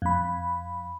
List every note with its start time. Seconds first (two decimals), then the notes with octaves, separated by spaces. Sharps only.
0.02 F2 B5